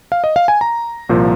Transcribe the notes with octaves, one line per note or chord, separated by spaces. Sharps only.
F5
D#5
F5
G#5
A#5
C2 A#2 F3